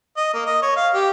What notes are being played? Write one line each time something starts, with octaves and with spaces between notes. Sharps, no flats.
D#5
A#3
D#5
C#5
F5
G4